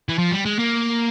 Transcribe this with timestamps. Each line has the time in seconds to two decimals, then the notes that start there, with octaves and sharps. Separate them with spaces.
0.09 E3
0.18 F3
0.31 G3
0.46 G#3
0.59 A#3